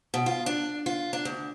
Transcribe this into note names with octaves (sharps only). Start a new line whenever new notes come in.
B2
F4
D4
F4
D4
D2